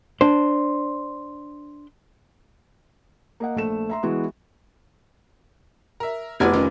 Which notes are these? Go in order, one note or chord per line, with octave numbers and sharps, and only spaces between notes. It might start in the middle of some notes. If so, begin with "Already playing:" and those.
D4 C5
A#3 D#5 F#5
A#1 A3 E7
E5 A#5 C6
E3 G#3 B3 E4 F#4
A#4 E5
F1 B3 E4 F#4 B4 D5 G#5 G#6
D#3 C#4 F4